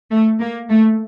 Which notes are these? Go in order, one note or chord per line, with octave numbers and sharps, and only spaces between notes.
A3
A#3
A3